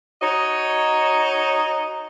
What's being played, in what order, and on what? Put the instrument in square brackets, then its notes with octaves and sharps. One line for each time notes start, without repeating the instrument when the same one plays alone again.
[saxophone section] D#4 F#4 C#5 D#5